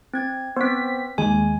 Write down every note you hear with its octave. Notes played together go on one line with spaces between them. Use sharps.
C4 G#6
B3 C4 C5 B6
D#2 G#3 G#5